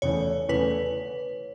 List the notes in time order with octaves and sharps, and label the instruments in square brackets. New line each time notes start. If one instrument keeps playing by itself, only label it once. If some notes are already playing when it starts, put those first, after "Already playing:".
[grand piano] E2 C#3 E3 A3 [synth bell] C#5
[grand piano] E2 C#3 E3 A3 [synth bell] B4